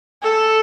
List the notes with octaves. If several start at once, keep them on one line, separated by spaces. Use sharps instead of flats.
A4